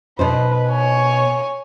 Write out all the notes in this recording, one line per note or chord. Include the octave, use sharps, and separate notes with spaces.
B2 D#4 B4 C5
C#5 G#5